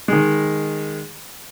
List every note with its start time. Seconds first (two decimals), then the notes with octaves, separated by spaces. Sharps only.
0.08 D#3 G#3